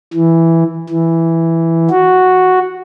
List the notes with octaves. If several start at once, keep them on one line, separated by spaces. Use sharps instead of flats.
E3
E3
F#4